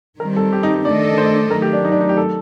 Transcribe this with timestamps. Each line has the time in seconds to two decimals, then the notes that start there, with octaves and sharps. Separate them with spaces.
0.19 D#3 G3 C4 A#4
0.36 A4
0.53 G4
0.63 D#4
0.74 D#4
0.85 D#3 A3 D4 A4 D5 D#5
1.18 C5
1.51 D#3 F#3 A3 A#4
1.62 G4
1.73 D4
1.85 D#4
1.92 D4
2.01 D#4
2.09 G4
2.17 A4